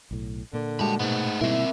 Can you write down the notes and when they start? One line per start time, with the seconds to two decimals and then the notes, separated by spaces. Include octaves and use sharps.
0.11 B1 A2
0.53 A#2 D3 A#3
0.79 G3 G#3 F#4 A5 B5
1.00 G#2 B2 A3 B3
1.41 B2 G3 A#3 C4 E4 A#4